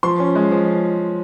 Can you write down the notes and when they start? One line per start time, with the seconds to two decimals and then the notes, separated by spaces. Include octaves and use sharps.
0.03 F3 C6
0.20 C#4
0.35 G#3
0.51 F3